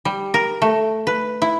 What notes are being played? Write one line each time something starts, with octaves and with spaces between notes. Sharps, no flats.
G3
A#4
A3
B4
E4